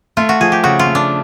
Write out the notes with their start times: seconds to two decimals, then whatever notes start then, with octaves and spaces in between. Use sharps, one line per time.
0.17 A3 F4
0.29 F#4
0.40 F3 G#4
0.52 G4
0.63 C#3 F#4
0.79 F4
0.86 A3
0.95 D4